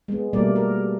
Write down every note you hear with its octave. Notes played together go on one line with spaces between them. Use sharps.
G#3 B3
B2 G3 A3 A#3 A#4 D5
A#4